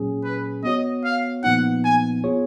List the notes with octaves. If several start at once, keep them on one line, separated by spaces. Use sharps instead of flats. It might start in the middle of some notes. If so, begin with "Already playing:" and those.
Already playing: A#2 F#3 C#4 G#4
B4
B3 F#4 C#5 D#5
F5
A#2 F3 B3 D#4 F#5
G#5
B3 F4 G#4 C#5